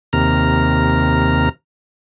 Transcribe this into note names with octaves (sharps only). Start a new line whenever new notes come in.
D#2 C3 A#5 F6